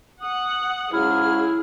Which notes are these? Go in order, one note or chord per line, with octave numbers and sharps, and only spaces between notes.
F#5 D#6
G#2 C#3 F#3 E4 G#4 F6